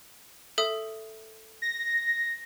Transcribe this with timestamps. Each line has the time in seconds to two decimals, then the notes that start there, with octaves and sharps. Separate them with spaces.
0.58 A4 E5 D#6
1.62 A#6